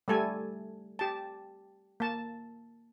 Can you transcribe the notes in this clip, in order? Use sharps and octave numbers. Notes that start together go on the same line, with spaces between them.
G3 A3 A4 G#5
G4 A5
A#3 A5